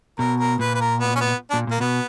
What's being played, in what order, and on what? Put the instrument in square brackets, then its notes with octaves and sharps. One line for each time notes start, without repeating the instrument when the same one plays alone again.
[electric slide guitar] B2 [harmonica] A#4
[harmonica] A#4
[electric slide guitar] A#2 [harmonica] B4
[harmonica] B4
A#4
B3
C#4
B3
D4
[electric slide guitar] A#2
[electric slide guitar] A#2 [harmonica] A#3
[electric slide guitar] B2 [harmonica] B3